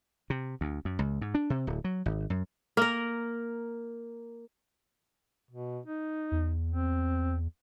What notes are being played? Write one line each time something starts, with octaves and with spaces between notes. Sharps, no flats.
C3
D2
F#2
C#2
G#2
D4
C3
D1
F#3
G#1
F#2
A#3 A#4
B2
D#4
E2
C4